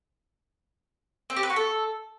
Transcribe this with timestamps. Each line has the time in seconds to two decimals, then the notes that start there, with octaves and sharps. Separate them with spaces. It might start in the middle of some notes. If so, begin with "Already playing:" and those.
1.30 C4
1.36 G4
1.43 B4
1.50 F#4
1.56 A4